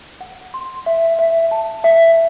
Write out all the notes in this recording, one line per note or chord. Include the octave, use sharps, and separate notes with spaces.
F#5
C6
E5
E5
A5
E5